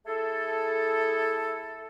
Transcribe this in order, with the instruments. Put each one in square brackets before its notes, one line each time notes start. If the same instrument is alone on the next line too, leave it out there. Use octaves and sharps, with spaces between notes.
[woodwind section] A3 E4 G#4 A4